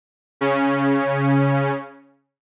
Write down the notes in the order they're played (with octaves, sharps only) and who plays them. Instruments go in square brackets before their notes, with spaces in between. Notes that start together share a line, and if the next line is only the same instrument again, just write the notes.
[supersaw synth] C#3 C#4